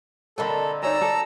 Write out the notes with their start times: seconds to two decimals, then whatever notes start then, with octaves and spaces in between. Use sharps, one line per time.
0.38 D3 A#3 C4 A4 A#4 D#5 B5
0.83 D#4 C#5 D5 G#5 A#5 E6
1.01 A4